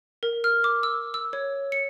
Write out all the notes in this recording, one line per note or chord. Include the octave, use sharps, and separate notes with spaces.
A#4
F6
D6
E6
E6
C#5
C#7